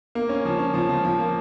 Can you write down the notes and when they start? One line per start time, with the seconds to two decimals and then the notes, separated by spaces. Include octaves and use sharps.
0.15 A#3
0.29 C#4
0.45 F3
0.59 C#4
0.74 F3
0.89 F3
1.05 F3
1.19 A#3